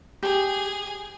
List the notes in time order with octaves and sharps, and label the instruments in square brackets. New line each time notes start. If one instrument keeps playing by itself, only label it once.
[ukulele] G4 [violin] G#4